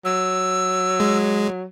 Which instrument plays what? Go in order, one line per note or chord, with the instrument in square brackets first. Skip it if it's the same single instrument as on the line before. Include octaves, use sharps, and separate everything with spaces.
[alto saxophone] F#3 [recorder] E6
[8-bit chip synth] G#3